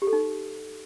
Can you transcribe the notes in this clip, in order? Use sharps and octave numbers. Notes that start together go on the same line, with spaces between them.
G4
A4
D#4